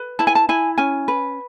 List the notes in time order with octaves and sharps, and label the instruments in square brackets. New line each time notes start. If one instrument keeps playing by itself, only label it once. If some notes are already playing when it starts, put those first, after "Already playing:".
Already playing: [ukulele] B4
E4 A5
G#5
A5
E4 G#5
C#4 G#5
B4